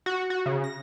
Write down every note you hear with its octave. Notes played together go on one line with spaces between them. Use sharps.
F#4
F#4
C#3
A#6